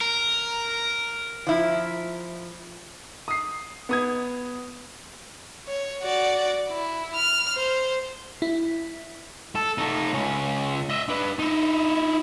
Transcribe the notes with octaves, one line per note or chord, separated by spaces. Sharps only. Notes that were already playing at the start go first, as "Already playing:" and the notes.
A#4
F3 E4
D#6 C7
B3 D#6 G#6
C#5
F#4 D5
E4
F6
C5
E4
A4
A3 D#4
C#2 C#4
D#5 E5
D4 B4
D#4 E4